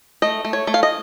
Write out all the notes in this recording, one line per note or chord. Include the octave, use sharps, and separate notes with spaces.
A3 D#5
A3
C#5
A3
F5
D#5